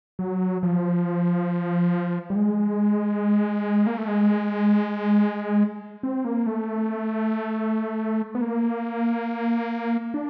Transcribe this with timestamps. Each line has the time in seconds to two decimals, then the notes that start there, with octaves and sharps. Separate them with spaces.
0.19 F#3
0.63 F3
2.30 G3
2.35 G#3
3.87 A#3
3.97 A3
4.08 G#3
6.03 C4
6.25 A#3
6.46 A3
8.35 B3
8.41 A#3
10.14 D4